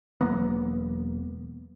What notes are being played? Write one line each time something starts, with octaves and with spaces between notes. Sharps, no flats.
E1 F#3 A#3 B3